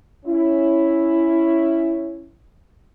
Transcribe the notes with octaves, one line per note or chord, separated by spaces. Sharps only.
C#4 E4